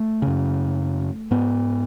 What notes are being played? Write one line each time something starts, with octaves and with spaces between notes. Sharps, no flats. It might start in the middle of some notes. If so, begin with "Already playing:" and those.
Already playing: A3
F#2 C#3
G#2 B3